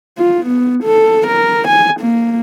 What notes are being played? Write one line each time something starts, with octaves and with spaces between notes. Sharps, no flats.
F4
B3
A4
A#4
G#5
A#3